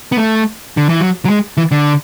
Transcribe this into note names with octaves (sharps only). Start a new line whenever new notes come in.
B3
A3
D3
E3
F#3
F#3
G#3
E3
D3